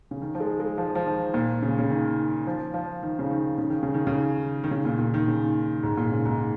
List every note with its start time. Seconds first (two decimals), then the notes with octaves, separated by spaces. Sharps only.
0.11 C#3
0.22 D#3
0.35 F3
0.40 G#3
0.60 G#3
0.78 F3
0.95 F3
1.07 D#3
1.34 A#2
1.62 C#3
1.79 C#3
1.90 D#3
2.47 F3
2.74 F3
3.03 D#3
3.19 C#3
3.30 D#3
3.58 C#3
3.70 D#3
3.83 C#3
3.94 D#3
4.07 C#3
4.64 D#3
4.71 C#3
4.85 A#2
4.99 A#2
5.14 D#3
5.28 C#3
5.83 G#2
5.97 A#2
6.11 C#3
6.25 G#2